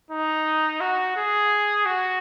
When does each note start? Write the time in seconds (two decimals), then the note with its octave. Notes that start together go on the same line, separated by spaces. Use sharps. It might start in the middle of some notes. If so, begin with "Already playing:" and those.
0.11 D#4
0.81 F#4
1.17 G#4
1.86 F#4